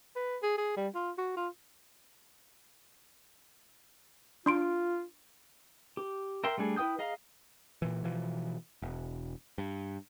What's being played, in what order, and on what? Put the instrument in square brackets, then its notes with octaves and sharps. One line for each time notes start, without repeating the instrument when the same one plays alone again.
[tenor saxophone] B4
G#4
G#4
G3
F4
F#4
F4
[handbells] D4 C6 D7 [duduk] F4
[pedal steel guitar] G4
A#4 E5 G5 C6
G3 A3 D4 G#4
E4 B4 G5 D#6 G6
G#4 D#5 F5 A#5
[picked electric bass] A#2 E3
B2 E3 F3
E1
G2